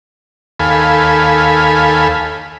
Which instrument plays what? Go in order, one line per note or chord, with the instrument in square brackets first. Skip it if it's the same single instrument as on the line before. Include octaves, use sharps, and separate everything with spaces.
[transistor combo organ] D#2 A4 F5 G#5 B5